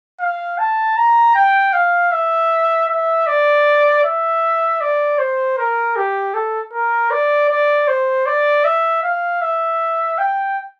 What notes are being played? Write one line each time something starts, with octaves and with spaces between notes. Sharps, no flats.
F5
A5
A#5
G5
F5
E5
E5
D5
E5
D5
C5
A#4
G4
A4
A#4
D5
D5
C5
D5
E5
F5
E5
G5